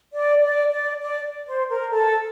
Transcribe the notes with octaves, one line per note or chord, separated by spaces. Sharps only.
D5
D5
D5
D5
C5
A#4
A4